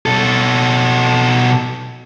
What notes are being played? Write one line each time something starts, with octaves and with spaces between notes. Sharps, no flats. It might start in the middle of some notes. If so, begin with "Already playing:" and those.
B2 A4